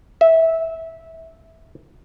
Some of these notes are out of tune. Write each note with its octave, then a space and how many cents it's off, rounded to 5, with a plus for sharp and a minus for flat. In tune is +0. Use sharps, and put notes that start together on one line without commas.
E5 -15